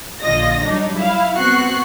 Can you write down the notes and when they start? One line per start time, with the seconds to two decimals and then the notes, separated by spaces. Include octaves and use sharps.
0.21 A#1 D3 F4 D#5 A#6
0.63 F#3 G3 D4 D#4
0.95 E4 F5
1.37 B3 C4 F#4 C#6 F#6 C7